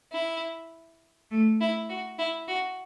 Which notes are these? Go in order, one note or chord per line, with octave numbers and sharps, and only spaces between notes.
E4
A3
E4
F#4
E4
F#4